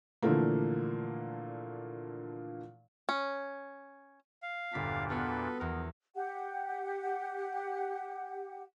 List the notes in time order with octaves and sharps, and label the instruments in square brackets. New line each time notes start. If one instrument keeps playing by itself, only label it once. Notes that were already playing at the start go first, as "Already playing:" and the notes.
[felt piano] A#2 D3 E3 F3 A3 A#3
[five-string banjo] C#4
[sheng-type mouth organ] F5
[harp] G1 B6 [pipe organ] E2 A#2 D4
[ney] B3 [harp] F4 F#4 [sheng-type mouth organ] A4 B4
[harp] E2 A#4
[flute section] G4 F#5